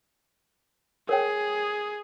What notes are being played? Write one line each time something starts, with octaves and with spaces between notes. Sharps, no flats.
G#4 A#4 C#5 G5